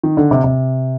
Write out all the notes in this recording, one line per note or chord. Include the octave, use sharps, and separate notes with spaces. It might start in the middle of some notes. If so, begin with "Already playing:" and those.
D#3
D3
C3
C3